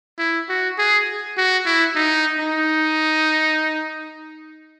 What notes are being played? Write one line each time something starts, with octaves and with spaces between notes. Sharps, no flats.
E4
F#4
G#4
F#4
E4
D#4
D#4